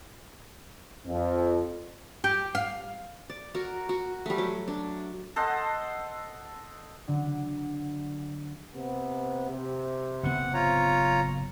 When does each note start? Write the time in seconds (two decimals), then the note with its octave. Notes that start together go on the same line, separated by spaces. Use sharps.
1.06 F2
2.24 G4
2.55 F5
3.30 D5
3.55 F#4 A#4
3.89 F#4
4.26 G3 A3
4.38 F#3
4.68 D4
5.36 A4 C5 D#5 F#5
7.08 D3 F#3
8.75 C3 B3
9.50 C3
10.23 F#1 A2 B3 F#5
10.54 F4 C#5 A#5